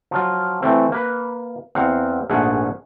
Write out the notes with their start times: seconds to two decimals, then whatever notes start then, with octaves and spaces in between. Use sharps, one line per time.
0.11 F3 F#3 F4
0.62 E3 A3 C4
0.92 A#3 B4
1.75 E2 C4 F5 F#5
2.30 A#1 G#2 A3 G#4 E5 F#5